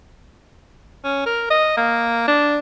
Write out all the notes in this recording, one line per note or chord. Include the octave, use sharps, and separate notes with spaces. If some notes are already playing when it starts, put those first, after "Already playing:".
C#4
A#4
D#5
A#3
D4